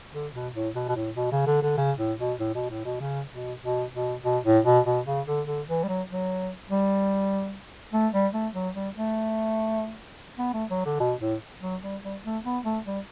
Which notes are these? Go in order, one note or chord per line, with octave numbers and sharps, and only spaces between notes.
D3
B2
A2
B2
B2
A2
B2
C#3
D3
D3
C#3
A2
B2
A2
B2
A2
B2
C#3
B2
B2
B2
B2
A2
B2
B2
C#3
D3
D3
E3
G3
F#3
F#3
G3
A3
G3
A3
F#3
G3
A3
B3
A3
F#3
D3
B2
A2
F#3
G3
G3
A3
B3
A3
G3